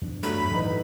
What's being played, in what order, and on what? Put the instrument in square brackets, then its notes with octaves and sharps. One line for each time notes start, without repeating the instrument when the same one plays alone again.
[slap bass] E2 D4
[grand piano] G2 F#3 A3 [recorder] B5
[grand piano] A2 D#4 B4 [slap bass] E3